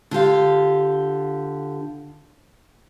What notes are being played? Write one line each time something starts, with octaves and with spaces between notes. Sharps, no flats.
D3 F4 G4 F5